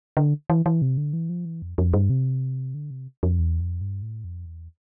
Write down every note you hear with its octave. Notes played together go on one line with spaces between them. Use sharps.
D3
E3
E3
C3
D3
E3
F3
E3
F2
F2
G2
C3
D3
C3
F2
E2
F2
G2
A2
F2
E2